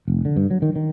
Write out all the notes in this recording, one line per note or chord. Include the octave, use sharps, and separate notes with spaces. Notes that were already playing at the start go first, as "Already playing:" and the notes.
F1
D3
G2
F#3
D#3
D#3